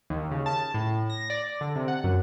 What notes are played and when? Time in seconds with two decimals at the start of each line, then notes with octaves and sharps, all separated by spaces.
0.10 D#2
0.31 C#3
0.46 A5
0.74 A2
1.10 A#6
1.30 D5
1.61 D3
1.75 C3
1.88 F#5
2.04 F#2